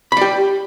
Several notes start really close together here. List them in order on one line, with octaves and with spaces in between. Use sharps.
B5 D5 G4